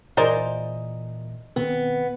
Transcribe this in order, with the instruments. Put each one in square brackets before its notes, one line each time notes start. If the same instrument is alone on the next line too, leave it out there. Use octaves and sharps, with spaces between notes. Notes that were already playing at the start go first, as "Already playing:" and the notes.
[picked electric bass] A#2 E3 [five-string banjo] D#4 C5 D5 [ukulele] G#4 A#4
[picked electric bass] B2 D#3 C4 [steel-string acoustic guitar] B3